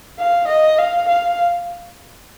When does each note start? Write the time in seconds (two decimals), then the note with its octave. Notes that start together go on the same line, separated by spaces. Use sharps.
0.19 F5
0.48 D#5
0.78 F5
1.08 F5